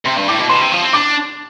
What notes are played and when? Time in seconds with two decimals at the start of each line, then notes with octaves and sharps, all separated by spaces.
0.06 C3 C6
0.17 G2
0.28 A2 D6
0.39 B2
0.49 B2 C6
0.61 C3
0.72 F3
0.82 C4
0.93 D4 D6